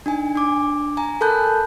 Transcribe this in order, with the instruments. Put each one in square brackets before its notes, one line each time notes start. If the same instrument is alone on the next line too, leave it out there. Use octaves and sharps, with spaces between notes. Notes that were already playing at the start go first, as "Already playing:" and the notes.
[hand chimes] D4 D#4 G#5
D4 D6
G#5 A#5
A4 A#4 A5 B5 F#6 G6